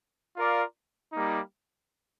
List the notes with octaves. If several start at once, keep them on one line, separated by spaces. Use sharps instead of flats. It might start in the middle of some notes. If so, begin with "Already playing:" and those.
F4 A#4 D5 F5
G3 A#3 D#4